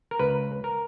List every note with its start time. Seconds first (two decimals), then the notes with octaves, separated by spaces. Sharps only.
0.11 A#4
0.19 C#2 B4
0.64 A#4